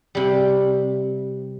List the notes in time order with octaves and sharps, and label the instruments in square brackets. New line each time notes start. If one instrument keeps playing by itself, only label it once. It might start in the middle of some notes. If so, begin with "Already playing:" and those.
[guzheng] C3 G3